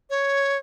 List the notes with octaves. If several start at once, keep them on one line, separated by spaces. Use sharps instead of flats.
C#5